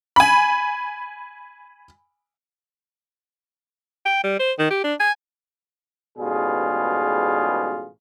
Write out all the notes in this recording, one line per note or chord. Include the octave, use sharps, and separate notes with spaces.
G#5 B5
G5
G3
C5
D#3
G4
D4
G#5
A1 G#2 B2 G3 F4 G#4